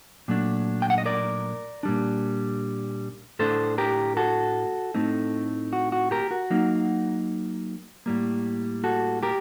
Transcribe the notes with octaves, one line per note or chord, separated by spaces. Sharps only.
A#2 F#3 A3 D4
G5
F#5
D#5
A#4 D5
A#2 G3 D4
A2 A3 D4 A4 C5
G4 A#4
F#4 A4
A2 A3 C4 D#4
F#4
F#4
G4 A#4
F#4
F#3 A#3 D#4
A2 G3 A#3
F#4 A4
G4 A#4